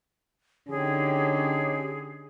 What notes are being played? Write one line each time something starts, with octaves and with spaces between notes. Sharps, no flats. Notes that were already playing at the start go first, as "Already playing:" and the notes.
D3 C#4 D#4 G4 G#4